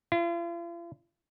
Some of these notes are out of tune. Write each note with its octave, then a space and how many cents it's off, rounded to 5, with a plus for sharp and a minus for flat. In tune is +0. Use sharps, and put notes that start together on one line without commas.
F4 -45